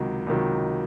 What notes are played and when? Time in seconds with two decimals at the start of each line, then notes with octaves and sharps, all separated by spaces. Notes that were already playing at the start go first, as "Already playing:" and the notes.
Already playing: C#2 C3 D#3 F#3
0.27 C#2 C3 D#3 F#3